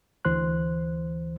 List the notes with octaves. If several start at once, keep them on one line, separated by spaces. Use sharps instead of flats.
D2 E3 C5 C6 F#6